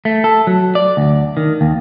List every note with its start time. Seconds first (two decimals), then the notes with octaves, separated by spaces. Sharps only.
0.05 A3
0.24 A4
0.47 F#3
0.75 D5
0.97 D2
1.37 D#3
1.61 D#2